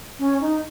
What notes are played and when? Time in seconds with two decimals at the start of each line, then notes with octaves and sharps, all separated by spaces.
0.19 C#4
0.41 D#4